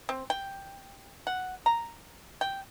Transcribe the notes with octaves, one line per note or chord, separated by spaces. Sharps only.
C4
G5
F#5
A#5
G5